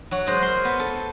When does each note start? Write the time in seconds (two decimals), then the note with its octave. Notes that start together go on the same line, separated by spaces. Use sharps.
0.11 F#3 F#4
0.27 G#3 C5 D#5
0.42 A#4 C6
0.65 B3
0.80 A4